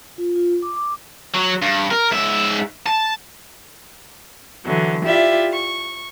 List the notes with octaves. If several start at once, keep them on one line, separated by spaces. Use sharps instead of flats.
F4
F4
D6
D6
F#3
G2
A#4
G#2 E5
A5
D3 E3 F#3
E4 F4 G4 D5 E5
C#6